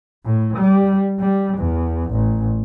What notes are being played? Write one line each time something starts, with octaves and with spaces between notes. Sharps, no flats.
A2
G3
G3
E2
A1